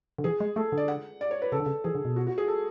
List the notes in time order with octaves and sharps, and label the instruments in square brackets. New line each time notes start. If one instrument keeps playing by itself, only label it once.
[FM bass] D3
[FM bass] E3 [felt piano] G#4
[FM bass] G#3
[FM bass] A3 [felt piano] A4
[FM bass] D3
[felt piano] D5
F#5
D5
C#5
B4
[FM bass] C#3 [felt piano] A4
[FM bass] D3
C#3
[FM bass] E3 [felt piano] G#4
[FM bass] D3
B2
[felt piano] F#4
F#4
G#4
A4